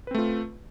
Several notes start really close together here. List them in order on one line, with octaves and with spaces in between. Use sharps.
B4 C4 A3 F4